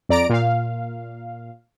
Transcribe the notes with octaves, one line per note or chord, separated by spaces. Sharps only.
F2 D5 A#5 D7
A#2 F5